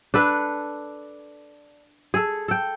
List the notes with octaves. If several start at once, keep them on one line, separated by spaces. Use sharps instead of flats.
D4 A4 B4
G#4 A4
A4 G5